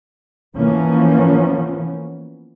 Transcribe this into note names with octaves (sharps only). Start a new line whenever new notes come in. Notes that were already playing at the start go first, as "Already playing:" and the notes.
E3 F3 A#3 B3 C#4